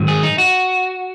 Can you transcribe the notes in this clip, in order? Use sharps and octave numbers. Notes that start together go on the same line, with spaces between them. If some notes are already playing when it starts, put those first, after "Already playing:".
Already playing: G#2 D#3 F#3
G#4
D#4
F#4